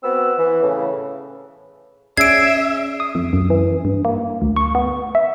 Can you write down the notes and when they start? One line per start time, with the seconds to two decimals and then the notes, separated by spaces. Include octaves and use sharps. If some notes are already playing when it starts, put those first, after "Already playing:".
0.03 B3 C4 F#4 F#5 E6
0.38 E3
0.62 A2 C#3
2.17 C#4 G#4 D5 E5 E6 G#6 C7 D7
3.00 D#6
3.15 F2
3.33 F#2
3.50 E3
3.85 G2
4.05 A#3
4.42 D2
4.56 C#6
4.75 B3
5.15 E5